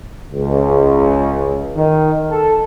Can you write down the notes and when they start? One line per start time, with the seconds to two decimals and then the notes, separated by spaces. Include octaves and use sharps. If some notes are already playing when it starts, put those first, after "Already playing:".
0.31 C#2
1.75 D#3
2.30 A4